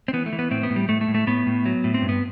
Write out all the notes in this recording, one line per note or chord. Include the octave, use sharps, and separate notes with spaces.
C4
E3 B3
A3
E3
B3
A2 C4
B3
A2
G3
A2 A3
A3
A2
A3
A2 B3
A2
F#3
A2
C4
G2
B3